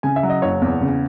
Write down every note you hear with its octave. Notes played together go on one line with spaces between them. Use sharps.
C#3 G#5
E5
F#3
D#5
F#1 C#5
E2
C#3